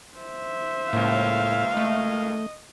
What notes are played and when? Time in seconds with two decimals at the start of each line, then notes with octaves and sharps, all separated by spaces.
0.17 C5 E5
0.93 C#2 A2 A#3 F5
1.77 A3 D#5